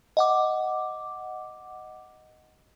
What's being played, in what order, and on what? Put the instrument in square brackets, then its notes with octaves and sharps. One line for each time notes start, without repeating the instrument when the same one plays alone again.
[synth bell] D#5 F#5 D6